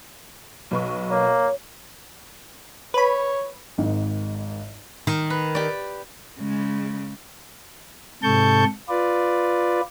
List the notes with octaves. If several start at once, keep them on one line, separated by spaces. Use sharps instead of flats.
B1 B4 C#6
A#3 C#5
B4 C#5 B5
G#1 G#2 D#3
D#3
B4
G4 D5
C#3 G#3
G#2 C3 A4 A5 C#6 G6
F4 B4 D5